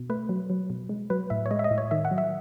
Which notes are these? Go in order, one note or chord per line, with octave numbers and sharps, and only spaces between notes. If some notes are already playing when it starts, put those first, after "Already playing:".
Already playing: B2
A3 B4
F#3
F#3
B2
G#3
F#3 B4
A2 E5
C#5
G#3 D#5
E5
D#5
A2
C#5
D#3 E5
F#5
F#3
E5